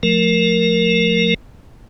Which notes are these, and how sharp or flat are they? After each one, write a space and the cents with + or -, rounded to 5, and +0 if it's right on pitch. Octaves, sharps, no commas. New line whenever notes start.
F3 +25 A3 +0 A#4 +0